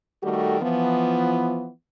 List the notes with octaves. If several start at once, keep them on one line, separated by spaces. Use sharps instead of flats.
D#3 G3 A3 F#4 G4 A4
E3 F3 B3